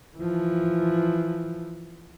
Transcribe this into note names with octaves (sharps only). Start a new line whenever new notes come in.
E3 F3